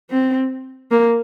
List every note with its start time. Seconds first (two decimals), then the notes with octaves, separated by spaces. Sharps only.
0.10 C4
0.91 A#3